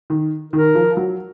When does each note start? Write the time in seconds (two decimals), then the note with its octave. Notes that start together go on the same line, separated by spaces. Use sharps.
0.10 D#3
0.53 D#3 A#4
0.75 F3
0.97 F#3